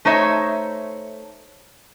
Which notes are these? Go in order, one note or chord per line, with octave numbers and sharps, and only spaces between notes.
A3 D#4 C5 C#5 E5